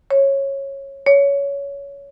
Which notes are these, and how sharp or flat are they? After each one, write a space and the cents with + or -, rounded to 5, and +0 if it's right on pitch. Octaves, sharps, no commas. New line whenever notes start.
C#5 -15
C#5 +15